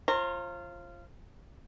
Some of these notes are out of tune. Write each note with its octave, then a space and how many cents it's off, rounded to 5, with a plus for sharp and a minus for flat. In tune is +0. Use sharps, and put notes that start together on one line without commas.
F4 -15 C5 +40 A#5 -25